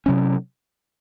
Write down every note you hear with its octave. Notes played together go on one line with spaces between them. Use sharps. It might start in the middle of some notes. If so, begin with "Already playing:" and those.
C3 F#3 C#4